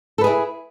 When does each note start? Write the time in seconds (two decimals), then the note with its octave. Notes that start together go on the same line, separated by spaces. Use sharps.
0.18 A4
0.21 B4
0.24 G#4
0.27 E4